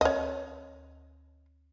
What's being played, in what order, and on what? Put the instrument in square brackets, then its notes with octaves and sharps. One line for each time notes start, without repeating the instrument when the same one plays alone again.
[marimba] D2 [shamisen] C#5 D#5